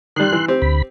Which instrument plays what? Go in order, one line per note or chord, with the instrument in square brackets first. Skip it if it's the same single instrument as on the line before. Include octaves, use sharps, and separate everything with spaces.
[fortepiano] D#3 G3 [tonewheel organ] C6 F#6
[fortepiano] E3
C4 G4
[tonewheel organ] D2 B5